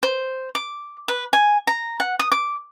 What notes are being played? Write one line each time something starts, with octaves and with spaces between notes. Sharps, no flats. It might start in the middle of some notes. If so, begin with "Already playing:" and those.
C5
D6
B4
G#5
A#5
F#5
D#6
D6